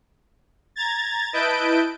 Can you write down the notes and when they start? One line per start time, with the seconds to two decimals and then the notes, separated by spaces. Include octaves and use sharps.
0.76 A#5 G#6 A6
1.33 E4 B4 D#5 A5 G6 D7